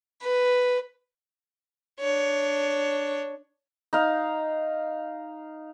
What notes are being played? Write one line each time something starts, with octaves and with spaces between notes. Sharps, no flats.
B4
D4 C#5
D#4 F5